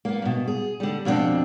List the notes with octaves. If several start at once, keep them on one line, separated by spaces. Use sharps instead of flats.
A#3 B3
G2 B2
G#4
D3 G3
F2 B2 B3 C4 D4